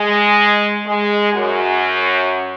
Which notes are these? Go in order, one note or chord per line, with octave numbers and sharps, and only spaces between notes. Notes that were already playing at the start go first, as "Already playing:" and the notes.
Already playing: G#3
G#3
F#2